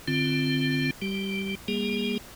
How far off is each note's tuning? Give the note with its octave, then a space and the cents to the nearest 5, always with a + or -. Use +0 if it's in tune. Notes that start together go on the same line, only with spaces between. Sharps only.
D3 +15 C4 +0 F4 -10
G3 +0 G4 -20
G3 +35 A#3 +15 G#4 -25